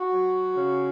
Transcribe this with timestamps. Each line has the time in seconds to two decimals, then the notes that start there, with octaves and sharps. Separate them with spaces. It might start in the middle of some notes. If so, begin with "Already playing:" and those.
Already playing: F#4
0.12 F#3
0.55 C#3